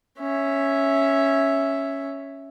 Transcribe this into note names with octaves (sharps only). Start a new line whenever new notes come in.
C#4 E5